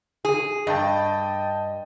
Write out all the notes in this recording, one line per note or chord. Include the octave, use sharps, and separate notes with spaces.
G#4
G2 D#5 G5 A5